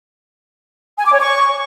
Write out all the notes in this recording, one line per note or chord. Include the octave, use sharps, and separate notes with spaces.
G#5
D6
C#5
C#6